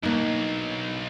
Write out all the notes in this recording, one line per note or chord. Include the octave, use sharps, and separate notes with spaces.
B1 A#3 D4 D#4